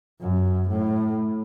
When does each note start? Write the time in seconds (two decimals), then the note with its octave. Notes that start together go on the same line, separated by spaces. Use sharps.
0.21 F#2
0.69 A2